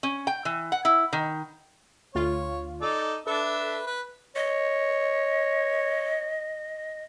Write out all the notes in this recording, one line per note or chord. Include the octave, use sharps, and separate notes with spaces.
C#4
G5
E3
F#5
E4
D#3
D2 F4 C#5
D#4 A4 D5
D4 A4 B4 E5
B4
C#5 D#5